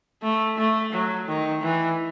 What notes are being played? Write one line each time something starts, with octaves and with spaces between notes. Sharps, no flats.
A3
A3
F#3
D#3
E3